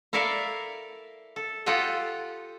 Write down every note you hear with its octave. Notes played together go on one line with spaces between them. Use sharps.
E4 A4 A#4 D5 E5 F5
A4
F4 G4 A4 D#5 F#5 G5